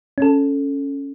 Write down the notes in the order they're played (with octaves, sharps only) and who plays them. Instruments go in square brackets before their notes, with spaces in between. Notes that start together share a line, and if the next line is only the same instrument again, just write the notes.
[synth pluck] C#4 A4